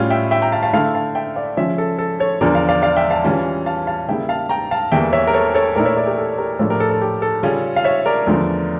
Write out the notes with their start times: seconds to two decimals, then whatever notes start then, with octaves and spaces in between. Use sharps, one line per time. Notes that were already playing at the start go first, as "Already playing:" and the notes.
Already playing: A2 G3 C#4 F4
0.10 E5 G5
0.31 E5 G5
0.42 G5 A#5
0.52 F5 A5
0.63 F5 A5
0.73 D3 A3 E4 F5 A5
0.94 F5 A5
1.15 E5 G5
1.36 D5 F5
1.57 C#3 F3 C#4 C#5 E5
1.78 A4
1.99 A4
2.20 A4 C#5
2.41 E2 D3 F3 A#4 D5
2.55 D5 F5
2.69 D5 F5
2.82 D5 F5
2.97 E5 G5
3.11 F5 A5
3.24 E3 G3 C#4 F4
3.66 F5 A5
3.87 F5 A5
4.08 C#3 G3 A#3 E4 E5 G5
4.29 F5 A5
4.49 G5 A#5
4.71 F5 A5
4.92 E2 E3 G3 A#3 E5 G5
5.13 C#5 E5
5.27 A#4
5.33 A4 C#5
5.54 A4 C#5
5.76 A#2 A3 E4 A#4 D5
5.85 C#5 E5
5.97 A#4 D5
6.07 G4 A#4
6.18 A4
6.38 G4 A#4
6.59 A2 F3 A3 D4 F4 A4 C#5
6.70 G4 A#4
6.80 A4
6.91 A4
7.02 G4
7.22 A4
7.43 C#3 G3 C#4 F4
7.76 F5
7.84 C#5 E5
8.06 A#4 D5
8.27 E2 D3 F3 A3